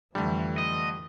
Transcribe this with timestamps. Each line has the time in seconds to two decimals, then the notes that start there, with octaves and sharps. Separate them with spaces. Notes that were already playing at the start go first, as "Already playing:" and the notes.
0.15 F2 D3 E3 G3 A3
0.58 D#5